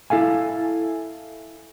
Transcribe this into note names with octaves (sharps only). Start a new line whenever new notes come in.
E4 A4 F5 G#5